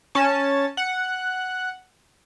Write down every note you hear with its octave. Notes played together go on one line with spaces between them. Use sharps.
C#4 A5
F#5